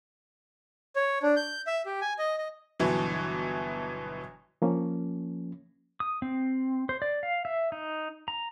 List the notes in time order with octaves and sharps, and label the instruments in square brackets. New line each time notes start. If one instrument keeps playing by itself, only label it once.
[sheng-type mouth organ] C#5
D4
G6
E5
G4
G#5
D#5
D#5
[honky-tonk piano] G1 B2 E3 F#3
[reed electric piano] F3 A#3 C#4
[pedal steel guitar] D#6
C4
C5
D5
F5
E5
D#4
A#5